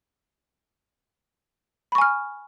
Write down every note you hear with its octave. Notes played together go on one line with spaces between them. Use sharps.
G#5 B5 C#6 F6